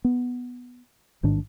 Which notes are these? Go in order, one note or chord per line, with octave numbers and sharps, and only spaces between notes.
B3
A1 G#2 D#3 D4